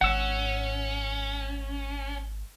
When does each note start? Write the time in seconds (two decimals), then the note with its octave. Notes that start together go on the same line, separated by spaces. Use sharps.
0.01 G#1 G#2 C#4 F#5 E6